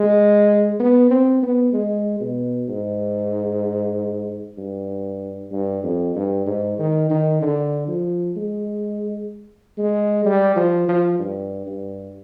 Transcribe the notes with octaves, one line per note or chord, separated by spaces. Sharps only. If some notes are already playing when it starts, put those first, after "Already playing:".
Already playing: G#3
B3
C4
B3
G#3
B2
G#2
G2
G2
F2
G2
G#2
D#3
D#3
D3
F3
G#3
G#3
G3
F3
F3
G2
G2